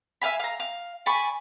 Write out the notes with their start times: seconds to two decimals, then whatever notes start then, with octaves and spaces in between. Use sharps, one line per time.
0.22 E5 F5 G#5 B5
0.39 F5 A#5
0.60 F5
1.06 D5 G#5 B5 C#6